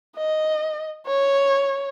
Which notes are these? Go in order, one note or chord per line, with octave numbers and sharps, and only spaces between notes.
D#5
C#5